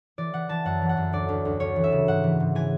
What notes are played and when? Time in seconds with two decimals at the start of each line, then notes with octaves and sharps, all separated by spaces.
0.18 E3 D5
0.34 E3 F#5
0.49 E3 A5
0.65 F#2 F#5
0.82 E3
0.89 F#5
0.97 F#2
1.13 D2 D5
1.29 D2
1.45 D2
1.60 D2 C#5
1.76 E3
1.84 E5
1.92 C#3
2.08 G#2 F#5
2.24 E3
2.40 G#2
2.55 E3 G#5